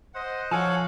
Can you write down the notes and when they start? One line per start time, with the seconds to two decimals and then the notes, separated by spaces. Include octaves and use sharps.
0.14 C5 D#5 F#5
0.51 F3 A4 C#5 F5 F#5 G#5